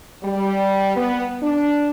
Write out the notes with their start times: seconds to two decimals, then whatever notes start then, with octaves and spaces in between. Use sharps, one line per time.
0.23 G3
0.96 B3
1.42 D4